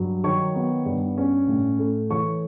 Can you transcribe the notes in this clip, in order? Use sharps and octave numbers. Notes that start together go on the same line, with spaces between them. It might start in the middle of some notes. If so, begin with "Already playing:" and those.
Already playing: G2 F#3
D#3 C#5 C#6
B3
G2
C#4
A2
A3
E3 C#5 C#6